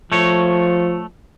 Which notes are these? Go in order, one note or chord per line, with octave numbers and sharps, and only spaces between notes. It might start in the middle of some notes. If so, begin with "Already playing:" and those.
F3 A3 C#5